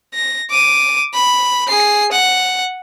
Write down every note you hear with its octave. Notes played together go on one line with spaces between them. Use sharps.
A#6
D6 D#7
B5
G#4 C7
F#5